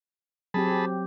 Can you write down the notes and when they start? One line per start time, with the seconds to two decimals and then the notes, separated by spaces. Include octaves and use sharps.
0.54 F#3 C4 G4 G#4 A5 B5